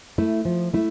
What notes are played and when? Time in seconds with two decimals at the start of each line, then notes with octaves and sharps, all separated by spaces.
0.18 A3 E4
0.45 F3
0.74 A3 E4